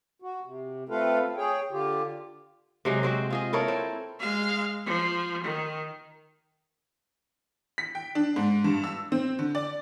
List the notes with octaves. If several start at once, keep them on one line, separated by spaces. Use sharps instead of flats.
F#4
C3
A3 C4 F4 A4 B4 F5
G#4 C#5 G5
D3 F4 G4
C3 F#3 G#3
G#3 C4 F#4
F4 G#4 D#5
E4 A4 A#4 C#5
C4
G#3 F5
F3
D#3
B6
G5
D4
G#2
G2
E6
C4
D3
D5